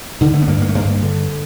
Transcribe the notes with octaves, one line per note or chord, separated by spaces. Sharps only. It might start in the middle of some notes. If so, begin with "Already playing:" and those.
D3 D#3
A3
B3
G2 A#3
A#3
A3
G2 A#3
D3